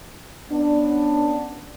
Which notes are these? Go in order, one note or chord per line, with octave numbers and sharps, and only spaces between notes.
B3 C#4 D4